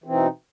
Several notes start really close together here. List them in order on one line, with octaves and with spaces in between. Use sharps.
E3 C4 B2 D#4